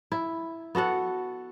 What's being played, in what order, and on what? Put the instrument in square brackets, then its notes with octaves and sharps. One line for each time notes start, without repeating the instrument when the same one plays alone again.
[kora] E4
B3 F#4 A4 F#5